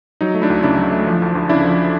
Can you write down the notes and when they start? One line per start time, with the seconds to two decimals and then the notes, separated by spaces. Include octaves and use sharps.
0.21 F#3 D#4
0.35 A3
0.42 D4 E4
0.50 D2
0.63 C#3 D4 E4
0.78 F#3
0.92 A3
1.07 F3
1.22 D2
1.35 D2
1.49 C#3 D4 E4
1.64 F3